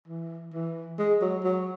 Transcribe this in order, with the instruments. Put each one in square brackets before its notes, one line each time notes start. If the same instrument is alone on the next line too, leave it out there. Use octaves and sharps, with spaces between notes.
[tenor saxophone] E3
E3
G#3
F#3
F#3